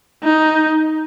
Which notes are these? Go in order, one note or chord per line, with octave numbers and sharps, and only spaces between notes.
D#4